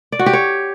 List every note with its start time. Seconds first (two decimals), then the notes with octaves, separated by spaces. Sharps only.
0.12 D5
0.19 F#4
0.26 G4
0.33 C#5